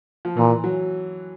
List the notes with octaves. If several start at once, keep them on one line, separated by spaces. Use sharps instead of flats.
F3
A#2 E3
F#3